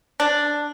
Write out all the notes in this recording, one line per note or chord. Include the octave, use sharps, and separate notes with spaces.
D4